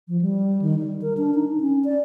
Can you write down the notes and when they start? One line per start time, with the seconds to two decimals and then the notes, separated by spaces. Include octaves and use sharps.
0.08 F3
0.21 G3
0.62 D#3
0.79 G3
1.02 A#4
1.17 D4
1.35 D#4
1.60 C#4
1.84 D5